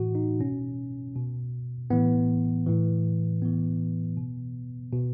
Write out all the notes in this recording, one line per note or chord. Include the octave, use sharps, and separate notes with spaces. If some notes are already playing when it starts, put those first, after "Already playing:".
Already playing: A2 E3 F#4
D#4
B2 C#4
B2
A2 E3 B3
A2 E3
A2 E3 B3
B2
B2